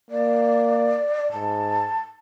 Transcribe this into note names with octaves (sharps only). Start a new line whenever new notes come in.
A#3 D5
G#2 A5